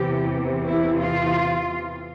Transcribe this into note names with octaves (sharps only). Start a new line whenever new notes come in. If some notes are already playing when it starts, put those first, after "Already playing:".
Already playing: E2 C3 E3 G4
E4
F4